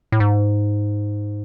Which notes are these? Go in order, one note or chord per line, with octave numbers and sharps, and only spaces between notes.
A2
G#2